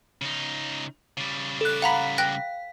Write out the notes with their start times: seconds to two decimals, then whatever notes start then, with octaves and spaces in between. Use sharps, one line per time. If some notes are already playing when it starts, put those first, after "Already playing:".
0.22 C#3 D#4
1.17 C#3 G3
1.61 A4 F#6
1.82 F5 F#5 A#5 B5 B6
2.18 G5 F#6 A#6